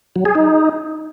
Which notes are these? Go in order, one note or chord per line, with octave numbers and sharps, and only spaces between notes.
F#3
G#4
D#4